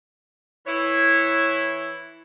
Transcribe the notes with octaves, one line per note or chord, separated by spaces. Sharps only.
E3 E4 C#5